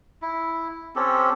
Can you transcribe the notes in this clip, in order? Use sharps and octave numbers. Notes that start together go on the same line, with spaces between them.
E4
C4 C#4 G4 A4